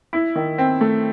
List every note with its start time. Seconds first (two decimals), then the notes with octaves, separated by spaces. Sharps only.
0.13 E4
0.35 D#3
0.58 C4
0.81 A3